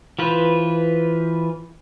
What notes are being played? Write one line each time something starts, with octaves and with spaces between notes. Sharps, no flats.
E3 F4 B4 C5